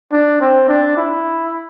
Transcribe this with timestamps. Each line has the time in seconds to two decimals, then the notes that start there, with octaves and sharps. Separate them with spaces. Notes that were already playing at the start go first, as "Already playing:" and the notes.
0.12 D4
0.41 C4
0.69 D4
0.97 E4